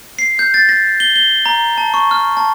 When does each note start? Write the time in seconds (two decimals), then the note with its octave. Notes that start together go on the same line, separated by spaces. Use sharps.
0.19 C7
0.39 G6
0.54 A6
0.69 A#6
1.00 G7
1.16 G7
1.46 A#5
1.78 A5
1.94 C#6
2.11 F6
2.37 A5